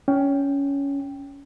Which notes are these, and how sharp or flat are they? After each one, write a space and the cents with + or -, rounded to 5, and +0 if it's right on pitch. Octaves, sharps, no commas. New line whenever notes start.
C#4 +15 G5 +0